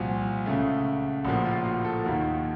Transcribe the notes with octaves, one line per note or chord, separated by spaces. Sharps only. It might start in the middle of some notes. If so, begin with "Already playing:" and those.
Already playing: C2 A#2 F3 F#4
C#2 C#3 A3
A#1 A2 F3 A#3 F#4
F4
F#4
A4
D#2 D#3 A#3 F#4